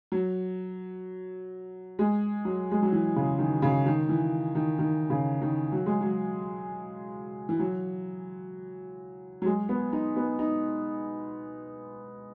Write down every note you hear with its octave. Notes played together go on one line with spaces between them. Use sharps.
F#3
G#3
F#3
G#3
F#3
E3
C#3
D#3
C#3
D#3
E3
D#3
D#3
C#3
D#3
F#3
G#3
F#3
E3
F#3
F#3
G#3
B3
D#4
B3
D#4